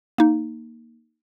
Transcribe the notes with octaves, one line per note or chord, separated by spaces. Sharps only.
A#3 D#4